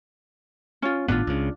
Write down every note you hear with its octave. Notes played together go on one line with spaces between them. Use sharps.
C#4 F4
G#1 A2 B3 D4 F4
C#2 C#3